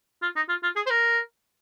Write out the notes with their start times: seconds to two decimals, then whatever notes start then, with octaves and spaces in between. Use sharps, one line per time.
0.22 F4
0.36 D#4
0.49 F4
0.63 F4
0.76 G#4
0.86 C5
0.90 A#4